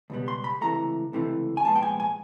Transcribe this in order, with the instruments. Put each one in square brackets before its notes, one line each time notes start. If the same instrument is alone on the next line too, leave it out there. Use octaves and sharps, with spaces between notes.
[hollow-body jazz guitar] C#2 B2 G3 B3
C6
B5
C#2 C3 E3 A3 A#5
C#2 C3 E3 A3
G#5
C2 A#2 F3 G#3 B3 A5
G5
G#5
G#5